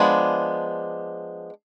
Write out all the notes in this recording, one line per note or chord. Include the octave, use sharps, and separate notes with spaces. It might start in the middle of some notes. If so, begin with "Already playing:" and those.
Already playing: F3 G#3 B3 D4